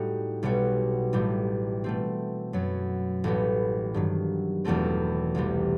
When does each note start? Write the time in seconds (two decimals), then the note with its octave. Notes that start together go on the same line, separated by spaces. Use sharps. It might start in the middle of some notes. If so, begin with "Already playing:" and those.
Already playing: A2 G3 D#4 F#4
0.43 B1 B2 G3 B3 F#4
1.13 A1 A2 G3
1.84 B2 A3 C4
2.53 F#2 F#3 B3
3.24 A1 A2 G3 B3
3.94 G2 D#3 F#3
4.64 E1 E2 B2 A3 C4
5.35 C2 C3 E3 G3